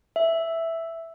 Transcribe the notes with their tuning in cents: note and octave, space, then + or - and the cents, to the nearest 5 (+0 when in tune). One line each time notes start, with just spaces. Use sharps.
E5 +0